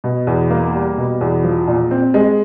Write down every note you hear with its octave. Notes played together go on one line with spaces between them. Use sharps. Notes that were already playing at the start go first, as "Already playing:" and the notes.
B2
E2
A#3
G3
B2
E2
F3
A#2
C4
G#3